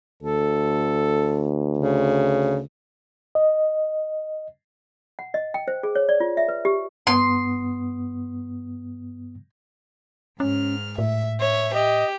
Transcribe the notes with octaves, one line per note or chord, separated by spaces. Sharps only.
D2 A4
C#3
D#5
F#5
D#5
G5
C5
G#4
C#5
D5
F4
E5
B4
G4
G2 B3 C6 D#6
G#2 C#4 F6
A2 E5
C#5 E5
G4 D#5